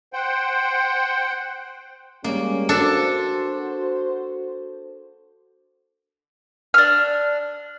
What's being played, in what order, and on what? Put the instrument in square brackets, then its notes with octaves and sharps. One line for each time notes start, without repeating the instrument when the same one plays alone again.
[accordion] C5 F#5 G5
[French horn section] G3 G#3 C#4 [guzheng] A#3
[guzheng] D4 A4 [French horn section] F#4 C5
[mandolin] D4 F6